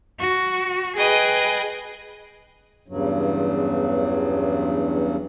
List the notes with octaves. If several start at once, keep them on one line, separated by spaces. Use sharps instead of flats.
F#4
G#4 B4 D#5 G5
E2 G2 C#3 F#3